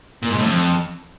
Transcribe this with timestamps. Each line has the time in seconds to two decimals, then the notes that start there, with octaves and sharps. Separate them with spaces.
0.22 A#2
0.30 G#2
0.38 A2
0.46 F2